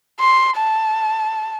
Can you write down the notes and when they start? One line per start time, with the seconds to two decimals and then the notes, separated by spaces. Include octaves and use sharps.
0.20 C6
0.57 A5